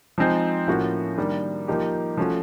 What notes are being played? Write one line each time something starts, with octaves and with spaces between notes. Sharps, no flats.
F3 G#3 C4 D#4
A2 F3 A#3 C#4 F#4
D#3 G3 A#3 D4
F3 A#3 D#4 G4
F3 A3 C#4 F#4